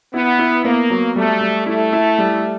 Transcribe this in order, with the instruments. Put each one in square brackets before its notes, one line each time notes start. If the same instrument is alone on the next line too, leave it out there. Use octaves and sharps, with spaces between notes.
[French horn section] B3 [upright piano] E4
[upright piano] E4
[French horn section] A#3 [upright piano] B3
[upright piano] F#3
[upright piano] G3 [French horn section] A3
[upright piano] G3
[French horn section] A3 [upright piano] E4
[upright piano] E4
G3